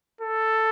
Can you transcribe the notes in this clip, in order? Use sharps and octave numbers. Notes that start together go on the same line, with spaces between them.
A4